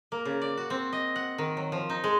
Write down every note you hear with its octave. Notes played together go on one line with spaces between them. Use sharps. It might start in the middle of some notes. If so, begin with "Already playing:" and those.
A#3
C#3
D5
F#4
C4
D#5
F#5
D#3
F#3
F3
D#4
G#3